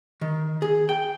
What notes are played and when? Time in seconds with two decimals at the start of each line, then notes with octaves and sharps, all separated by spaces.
0.21 D#3
0.62 G#4
0.89 G5